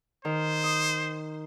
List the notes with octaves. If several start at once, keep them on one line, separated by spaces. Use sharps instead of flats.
D#3 C5
D#6